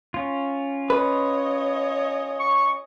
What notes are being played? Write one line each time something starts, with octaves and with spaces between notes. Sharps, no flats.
C#4 F4
B4 C#5 D#5
C#6